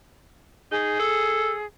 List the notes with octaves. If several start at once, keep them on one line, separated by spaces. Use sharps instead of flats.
D#4 G#4
A4